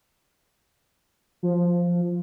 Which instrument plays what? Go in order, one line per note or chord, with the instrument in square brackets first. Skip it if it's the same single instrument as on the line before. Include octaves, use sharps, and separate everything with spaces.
[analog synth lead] F3